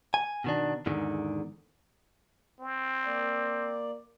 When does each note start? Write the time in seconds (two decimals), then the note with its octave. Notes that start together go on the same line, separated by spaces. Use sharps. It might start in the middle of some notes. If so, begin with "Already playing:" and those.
0.14 G#5
0.44 B2 D#3 D4
0.86 E2 G#2 D3 D#3
2.61 C4
3.06 A#3 D5